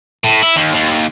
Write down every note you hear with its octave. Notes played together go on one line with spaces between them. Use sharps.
A2
E4
D#2
D#2